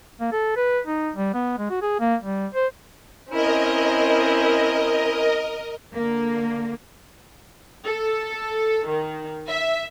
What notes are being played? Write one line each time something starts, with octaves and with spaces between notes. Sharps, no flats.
A#3
A4
B4
D#4
G3
B3
G#3
F#4
G#4
A#3
G3
C5
C4 C#4 E4 A#4 D#5
D3 A#3
A4
D#3
E5